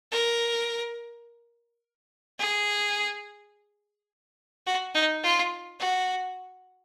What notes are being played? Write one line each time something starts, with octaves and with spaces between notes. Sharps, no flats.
A#4
G#4
F#4
D#4
F4
F#4